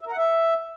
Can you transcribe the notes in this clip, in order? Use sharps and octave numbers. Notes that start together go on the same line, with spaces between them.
E5
A#4
F#5
E5